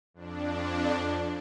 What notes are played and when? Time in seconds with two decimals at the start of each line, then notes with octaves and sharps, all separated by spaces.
0.14 F2 D4